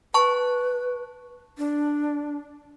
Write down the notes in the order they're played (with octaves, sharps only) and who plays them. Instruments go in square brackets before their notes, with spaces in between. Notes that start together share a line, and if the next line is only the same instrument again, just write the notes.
[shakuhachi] B4 [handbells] A5 C#6
[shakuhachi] D4